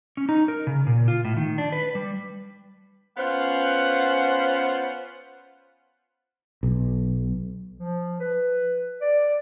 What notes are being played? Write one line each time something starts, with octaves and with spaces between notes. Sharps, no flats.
C#4
D#4
A#4
C#3
A#2
F4
A2
D#3
D4
B4
G3
B3 C#4 F4 C5 F5 F#5
B1
F3
B4
D5